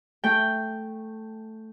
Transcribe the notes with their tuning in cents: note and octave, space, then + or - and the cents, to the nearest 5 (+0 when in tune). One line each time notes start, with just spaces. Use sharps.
A3 +0 G5 +0